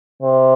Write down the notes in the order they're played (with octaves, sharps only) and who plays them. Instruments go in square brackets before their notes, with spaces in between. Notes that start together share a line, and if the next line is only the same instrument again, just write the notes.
[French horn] C3